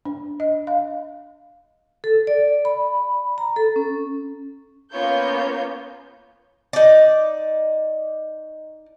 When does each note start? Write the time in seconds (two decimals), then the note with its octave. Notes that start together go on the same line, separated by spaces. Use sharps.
0.05 D4
0.40 D#5
0.67 F5
2.04 A4
2.27 D5
2.65 B5
3.38 A#5
3.56 A4
3.76 C#4
4.92 A#3 B3 C#4 F4 C#5 G6
6.73 D#4 D5